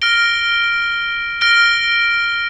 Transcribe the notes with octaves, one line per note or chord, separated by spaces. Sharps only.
F6 A#6 D7 G7
F6 A#6 D7 G7